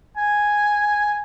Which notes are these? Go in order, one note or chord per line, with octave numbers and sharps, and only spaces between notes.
G#5